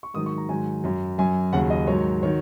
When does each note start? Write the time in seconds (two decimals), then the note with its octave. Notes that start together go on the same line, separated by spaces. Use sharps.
0.03 C#6
0.14 G#2 D#3 F#3 D#6
0.26 C#6
0.38 A#5
0.49 G#2 D#3 F#3 G#5
0.84 F#2 F#3
1.18 F#2 F#3 G#5
1.53 D#2 C#3 F#3 F#5
1.70 D#5
1.87 G#2 D#3 F#3 C#5
2.23 D#3 F#3 C#5